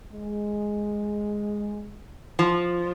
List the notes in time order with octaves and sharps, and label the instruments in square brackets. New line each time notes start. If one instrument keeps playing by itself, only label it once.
[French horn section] G#3
[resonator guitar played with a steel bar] F3